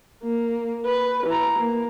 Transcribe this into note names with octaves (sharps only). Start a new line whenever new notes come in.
A#3
B4
E3 A#5
A#3